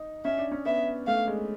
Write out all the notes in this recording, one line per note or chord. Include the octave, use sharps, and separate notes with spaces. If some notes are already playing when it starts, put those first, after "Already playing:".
Already playing: D#4
C#4 E5
D4
C#4
B3 E5
A3 F5
G#3